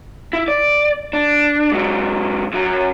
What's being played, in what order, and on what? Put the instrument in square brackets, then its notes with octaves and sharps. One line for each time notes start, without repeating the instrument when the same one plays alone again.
[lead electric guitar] E4
D5
D4
G#2 F#3
F#2 F#3